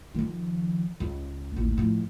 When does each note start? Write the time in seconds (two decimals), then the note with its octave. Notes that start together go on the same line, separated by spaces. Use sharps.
0.15 D#3 F3
1.00 C#2
1.57 A1 D#2
1.78 A2 F3